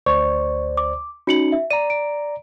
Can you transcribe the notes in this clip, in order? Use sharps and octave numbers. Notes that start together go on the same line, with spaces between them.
D2 C5 D5 C#6
D6
C#4 D#4 F#4 C#7 F#7
E5
D5 A#5 D#7
D7